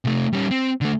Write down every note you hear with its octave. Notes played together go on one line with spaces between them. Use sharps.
C3 A3
G3 C#4
C4
D3 A3